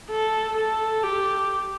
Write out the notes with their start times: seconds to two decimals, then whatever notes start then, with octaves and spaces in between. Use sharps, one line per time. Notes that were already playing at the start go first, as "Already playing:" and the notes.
0.11 A4
0.57 A4
1.03 G4